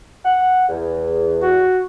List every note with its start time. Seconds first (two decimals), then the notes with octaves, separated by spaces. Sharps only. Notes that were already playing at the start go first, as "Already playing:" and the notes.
0.25 F#5
0.69 E2
1.43 F#4